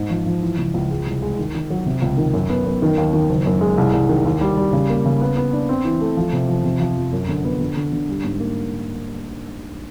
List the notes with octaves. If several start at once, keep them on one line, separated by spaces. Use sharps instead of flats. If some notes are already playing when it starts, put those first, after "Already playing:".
Already playing: G#2
F3
F3
E3
C#2
C#2
G#3
C2
G#3
D#3
D#3
F#3
C3
C#2
D#3
F#2
B3
F#2
D#3
D#2
D#3
F#1
F#2
G#3
C2
C2
D#3
D#2
G3
G3
C#3
A#3
C#3
B3
B3
D4
C4
E3
A3
F3
C3
F3
C3
F3
F2
F#2
D3
B3
D3
D3
D3
G3
G#2
A#3